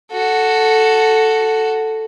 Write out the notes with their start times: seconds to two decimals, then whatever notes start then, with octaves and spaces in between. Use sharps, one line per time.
0.12 F#4 A4